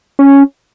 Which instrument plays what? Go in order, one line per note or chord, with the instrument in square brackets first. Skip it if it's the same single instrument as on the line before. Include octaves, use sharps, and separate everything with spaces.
[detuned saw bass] C#4